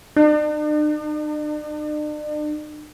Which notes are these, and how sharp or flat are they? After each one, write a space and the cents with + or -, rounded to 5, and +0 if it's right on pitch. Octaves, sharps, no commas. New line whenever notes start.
D4 +45